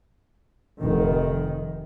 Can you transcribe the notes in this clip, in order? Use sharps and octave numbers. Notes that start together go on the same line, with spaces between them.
F1 D#3